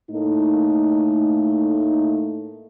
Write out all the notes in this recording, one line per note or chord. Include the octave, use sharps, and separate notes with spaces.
A2 A3 A#3 D#4